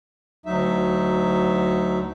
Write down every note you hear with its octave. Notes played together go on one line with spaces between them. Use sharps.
D2 F#3 D#4 E5